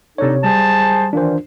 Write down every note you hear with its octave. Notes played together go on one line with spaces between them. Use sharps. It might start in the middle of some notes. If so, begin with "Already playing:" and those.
C3 D4 D#4 A4 C#5
G3 G#4 C5 A5
A#2 D#3 E3 D4 C5